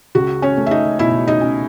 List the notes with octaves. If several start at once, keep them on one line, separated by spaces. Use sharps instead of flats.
C#2 F#4
C#4 C#5
A3
E5
D#4 D#5
B2 E4 E5
D#4 D#5
C#4